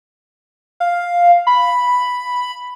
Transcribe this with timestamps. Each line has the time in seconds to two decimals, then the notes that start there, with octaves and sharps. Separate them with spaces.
0.80 F5
1.47 B5